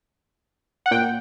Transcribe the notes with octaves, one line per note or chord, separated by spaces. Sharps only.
F#5
A#2 G5